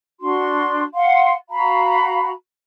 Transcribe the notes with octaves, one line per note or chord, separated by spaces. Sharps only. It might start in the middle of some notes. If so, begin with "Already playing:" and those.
D4 F#4 C6
F5 F#5 C6
F#4 F5 A#5 B5